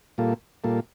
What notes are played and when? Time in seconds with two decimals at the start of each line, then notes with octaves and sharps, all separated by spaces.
0.18 A#2 G3 A#3 F4 A4
0.64 A#2 G3 A#3 F4 A4